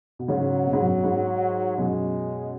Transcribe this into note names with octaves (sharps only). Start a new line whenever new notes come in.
B2
G#2 C#3 F#3
B2
G#2
F#2 B2
G#2
F#2 B2 G#3